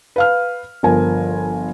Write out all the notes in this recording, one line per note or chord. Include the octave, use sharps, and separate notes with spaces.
B4 F5 F6
G1 F3 A#4 G#5